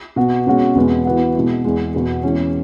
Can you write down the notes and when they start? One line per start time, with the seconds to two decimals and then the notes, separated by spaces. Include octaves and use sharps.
0.16 B2 B3 F#4
0.47 B2 G#3 C#4 F#4
0.75 E2 B2 G#3 B3
1.05 E3 B3 F#4
1.35 B2 G#3 E4
1.65 E2 E3 G#3
1.94 E2 B2 B3 F#4
2.23 E2 E3 G#3 C#4